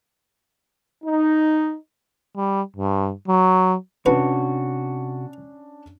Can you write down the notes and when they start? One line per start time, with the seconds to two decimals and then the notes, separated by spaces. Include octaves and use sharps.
1.04 D#4
2.37 G3
2.77 G2
3.28 F#3
4.06 C3 C#4 D4 F#4 B4